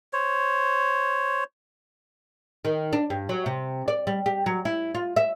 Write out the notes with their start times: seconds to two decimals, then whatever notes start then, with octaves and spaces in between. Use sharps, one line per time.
0.13 C5 C#5
2.65 D#3
2.93 D4
3.10 G2
3.29 F#3
3.46 C3
3.88 D5
4.07 G3
4.26 G4
4.46 F#3
4.65 E4
4.95 F4
5.16 E5